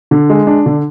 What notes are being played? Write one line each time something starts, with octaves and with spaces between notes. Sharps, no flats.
D3
G#3
D4
D3